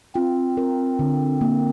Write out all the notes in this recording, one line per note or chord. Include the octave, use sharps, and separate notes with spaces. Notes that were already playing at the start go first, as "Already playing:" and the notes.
C4 F4
A#4
D3
A#3